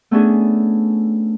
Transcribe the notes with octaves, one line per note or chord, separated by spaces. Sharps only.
A3 B3 C#4 D4 G#4